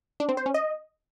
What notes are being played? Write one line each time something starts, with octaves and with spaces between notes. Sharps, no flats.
D4
C4
C5
C#4
D#5